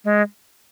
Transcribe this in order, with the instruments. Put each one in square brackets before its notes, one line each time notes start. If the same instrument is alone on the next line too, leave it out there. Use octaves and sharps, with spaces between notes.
[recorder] G#3